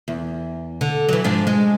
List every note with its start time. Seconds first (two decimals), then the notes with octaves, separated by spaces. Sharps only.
0.08 E2
0.81 D3
1.09 E3 F#3
1.24 G#2 F3 D4
1.47 G#3